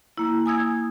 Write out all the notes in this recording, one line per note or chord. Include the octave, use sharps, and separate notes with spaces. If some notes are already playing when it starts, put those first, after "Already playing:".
A#3 E4
G#5 D#6 E6 G#6